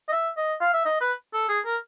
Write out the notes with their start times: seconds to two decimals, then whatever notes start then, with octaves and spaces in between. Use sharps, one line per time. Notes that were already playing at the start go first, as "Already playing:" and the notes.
0.09 D#5
0.12 E5
0.37 D#5
0.61 F5
0.74 E5
0.86 D#5
1.01 B4
1.34 A4
1.49 G#4
1.65 A#4